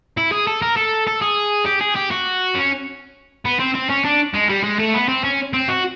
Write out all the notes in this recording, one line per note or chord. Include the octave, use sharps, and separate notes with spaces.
E4
G#4
A4
A#4
A4
A4
G#4
G4
G#4
G4
F#4
C#4
B3
C4
C4
C#4
D4
G#3
G3
G#3
A3
B3
C4
C#4
C4
F#4